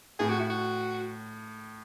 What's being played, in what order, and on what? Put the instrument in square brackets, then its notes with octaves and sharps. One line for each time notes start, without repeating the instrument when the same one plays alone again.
[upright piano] A2 [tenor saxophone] G#4
[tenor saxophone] F#4
E4
F#4